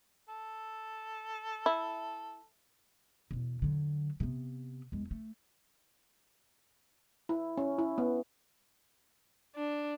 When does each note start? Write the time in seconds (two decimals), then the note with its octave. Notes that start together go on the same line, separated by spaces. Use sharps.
0.29 A4
1.66 E4
3.31 E2 B2
3.62 D3 F#3
4.20 C3 B3
4.92 E2 G#3
5.11 A3
7.29 E4
7.58 C#4
7.78 E4
7.98 B3
9.55 D4